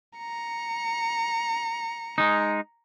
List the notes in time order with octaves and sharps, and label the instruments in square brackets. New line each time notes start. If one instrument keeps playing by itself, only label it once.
[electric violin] A#5 C#7
[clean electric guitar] G#3 D#4